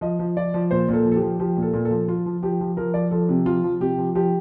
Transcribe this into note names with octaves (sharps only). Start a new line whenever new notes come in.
F3 D#5
F3
F3 D5
F3
A#2 C5
A#2 A4
F3
A4
G4
F3
F3 G4
A#2
A4
A#2
A4
F3
F3 F4
F3
F3 G4
F3
F3 A#4
F3 D5
F3 A4
C3
F3 F4
F3
C3 G4
F3
F3 G4